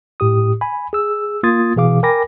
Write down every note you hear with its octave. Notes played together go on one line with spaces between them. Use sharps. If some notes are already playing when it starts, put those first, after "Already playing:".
A2 G4 D#6
G#5 B5
G#4 E6
A#3 F4 C6 D#6 G#6 A6
B2 E3 G#4 F5 D6
A#4 G5 G#5 B5 D6 A#6